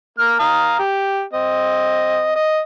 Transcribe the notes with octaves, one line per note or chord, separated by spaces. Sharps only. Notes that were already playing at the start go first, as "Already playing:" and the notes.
A#3 F6
F5 A#5 D#6
G4
C4 D#5
D#5